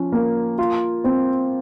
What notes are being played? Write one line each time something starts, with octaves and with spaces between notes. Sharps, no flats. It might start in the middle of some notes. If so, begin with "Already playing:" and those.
Already playing: F3 C#4
A#3
F4
C4